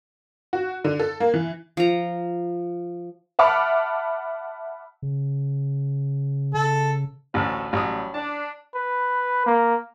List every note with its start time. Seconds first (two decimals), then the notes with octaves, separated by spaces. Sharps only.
0.53 F#4
0.84 D3
0.99 A4
1.20 A#3
1.34 E3
1.77 F3 A#5
3.39 E5 F#5 A5 B5 D6 F6
5.02 C#3
6.54 C#3 A4
7.34 A1 D2 C5 C#5 A5
7.73 A1 F#3 G3 D#6
8.14 D4 A5
8.75 B4
9.46 A#3